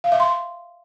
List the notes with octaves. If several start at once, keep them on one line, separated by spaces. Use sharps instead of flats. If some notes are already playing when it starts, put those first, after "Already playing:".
F5
E5
C6